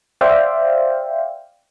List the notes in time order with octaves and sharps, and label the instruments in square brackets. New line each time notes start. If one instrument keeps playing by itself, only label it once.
[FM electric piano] C5 D5 E5 F5 G5